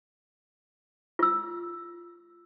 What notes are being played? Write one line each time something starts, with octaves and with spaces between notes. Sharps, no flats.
F4 E6